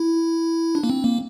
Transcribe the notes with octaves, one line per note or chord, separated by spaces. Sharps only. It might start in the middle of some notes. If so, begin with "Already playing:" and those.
Already playing: E4
D4
A#3
C4
A#3